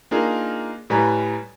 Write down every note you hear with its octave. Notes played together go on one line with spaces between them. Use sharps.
A#3 D4 D#4 F4 G#4 A#4
A2 G3 B4 G#5 A#5